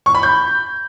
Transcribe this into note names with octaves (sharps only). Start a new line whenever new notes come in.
C#6
B5
G6